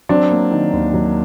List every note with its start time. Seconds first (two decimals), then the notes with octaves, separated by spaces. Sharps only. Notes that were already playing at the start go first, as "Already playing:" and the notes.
0.09 F#3 C4 D4
0.31 A#3
0.51 D#3
0.73 D#2
0.94 F#3